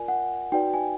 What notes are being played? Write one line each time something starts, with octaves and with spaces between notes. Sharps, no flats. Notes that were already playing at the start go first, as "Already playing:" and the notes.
Already playing: F4 A#4 D5 G#5
F#5
D#4 F#4 B4 D5 G5
G#5